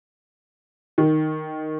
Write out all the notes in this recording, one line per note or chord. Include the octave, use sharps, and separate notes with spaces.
D#3